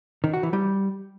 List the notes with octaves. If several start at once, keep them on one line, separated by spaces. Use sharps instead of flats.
D#3
F#4
E3
G3